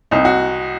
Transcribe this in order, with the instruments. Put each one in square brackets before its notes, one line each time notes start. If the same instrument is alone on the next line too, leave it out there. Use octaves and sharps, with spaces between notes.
[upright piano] C2 D#4
F#4